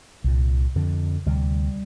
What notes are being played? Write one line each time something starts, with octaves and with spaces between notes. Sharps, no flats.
C2 A#2
F2 D3
D2 C3 G3